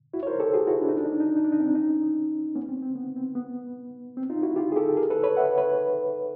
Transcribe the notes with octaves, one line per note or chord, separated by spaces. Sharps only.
E4 F#4
C#5
A#4 C5
G4 A4
F#4 G#4
E4 F#4
D4
D#4
D4
D#4
D4
D#4
D4
D#4
D4
D#4
C4 D4
C#4 D#4
B3 C#4
C4
C4
B3
C4
B3
C4
D#4 F4
E4 F#4
F4 G4
G#4
G4 A4
G#4 A#4
A4 B4
B4 C#5
E5 F#5
B4 C#5